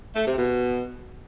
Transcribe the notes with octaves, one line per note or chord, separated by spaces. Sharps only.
A3
C3
B2